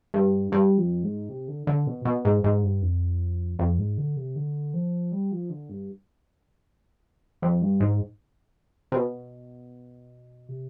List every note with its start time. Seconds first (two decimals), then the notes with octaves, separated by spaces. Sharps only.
0.14 G2
0.52 G2
0.78 F2
1.03 G#2
1.29 C3
1.48 D3
1.67 D3
1.87 B2
2.05 B2
2.25 G#2
2.44 G#2
2.63 G2
2.82 F2
3.59 F2
3.78 G#2
3.98 D3
4.16 C3
4.36 D3
4.74 F3
5.12 G3
5.32 F3
5.50 D3
5.69 G2
7.42 F2
7.62 G2
7.80 G#2
8.92 C3
8.96 B2
10.49 C3